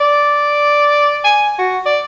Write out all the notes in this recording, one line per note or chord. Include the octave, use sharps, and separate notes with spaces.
D5
G#5
F#4
D5